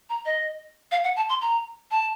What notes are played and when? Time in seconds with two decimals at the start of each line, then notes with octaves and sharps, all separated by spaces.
0.09 A#5
0.26 D#5
0.92 F5
1.04 F#5
1.16 A5
1.29 C6
1.41 A#5
1.91 A5